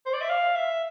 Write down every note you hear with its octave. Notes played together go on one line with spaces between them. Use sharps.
C5
D5
E5
F5
E5